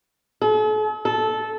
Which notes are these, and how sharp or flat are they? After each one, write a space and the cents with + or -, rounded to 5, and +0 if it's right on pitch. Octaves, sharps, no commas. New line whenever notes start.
A4 -45
A4 -15